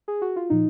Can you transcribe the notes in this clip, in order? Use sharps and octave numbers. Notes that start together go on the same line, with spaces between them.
G#4
F#4
F4
A#2 F3 D#4